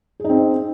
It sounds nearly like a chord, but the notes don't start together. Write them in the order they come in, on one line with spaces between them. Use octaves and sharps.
G#4 D#4 C4